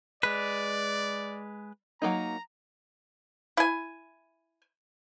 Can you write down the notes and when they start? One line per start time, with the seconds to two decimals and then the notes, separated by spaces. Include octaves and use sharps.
0.23 G#3 B4 D5
2.02 F#3 A#3 D#4 A#5
3.57 E4 G#5